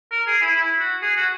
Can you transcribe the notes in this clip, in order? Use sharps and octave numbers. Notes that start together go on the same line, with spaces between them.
A#4
G#4
E4
E4
F#4
G#4
F#4